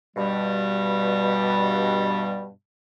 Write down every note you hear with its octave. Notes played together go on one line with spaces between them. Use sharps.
G2 B2 G3